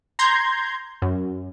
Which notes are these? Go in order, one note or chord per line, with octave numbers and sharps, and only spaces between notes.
A#5 C6 G6 G#6
F#2